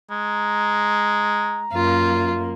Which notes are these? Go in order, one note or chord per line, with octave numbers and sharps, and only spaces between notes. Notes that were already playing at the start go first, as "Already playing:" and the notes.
G#3 A#5
F#2 A#3 F4